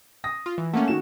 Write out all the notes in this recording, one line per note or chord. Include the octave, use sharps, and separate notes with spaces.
D#6 A#6
F4
E3
A3 A#3 C#4 F#5
D#3 F#4 E7